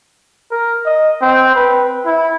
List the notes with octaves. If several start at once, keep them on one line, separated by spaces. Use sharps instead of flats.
A#4
D#5
C4
B4
E4